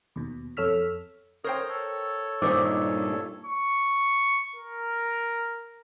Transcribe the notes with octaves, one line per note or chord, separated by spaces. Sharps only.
D#2 B2
F2 A4 C#5 E6 F6 B6
A#4 C5 C#5 G5 D#6
A4 C#5
G2 A#2 D#3 D#4 A#4 C5 D6
C#6
A#4